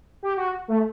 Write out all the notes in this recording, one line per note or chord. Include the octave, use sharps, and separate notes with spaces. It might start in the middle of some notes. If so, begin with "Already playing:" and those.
G4
F#4
A3